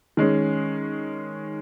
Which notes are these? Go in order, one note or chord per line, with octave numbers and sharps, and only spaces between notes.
D#3 G#3 C#4